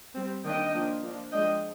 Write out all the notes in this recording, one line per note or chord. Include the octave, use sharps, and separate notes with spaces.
G3 C4
D#3 G3 A#3 D4 D#5 G5
F3 A#3 D4
F3 A#3 D4
F3 G#3 D4 D#5 G5